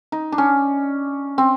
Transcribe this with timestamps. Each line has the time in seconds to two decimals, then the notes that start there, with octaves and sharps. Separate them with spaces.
0.12 D#4
0.32 D4
0.38 C#4
1.38 C4